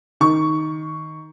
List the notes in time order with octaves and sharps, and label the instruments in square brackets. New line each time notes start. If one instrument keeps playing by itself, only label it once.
[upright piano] D#3 C#6